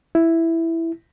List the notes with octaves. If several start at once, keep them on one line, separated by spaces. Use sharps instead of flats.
E4